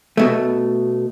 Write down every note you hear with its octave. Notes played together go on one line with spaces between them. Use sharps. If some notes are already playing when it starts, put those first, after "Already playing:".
B2 A3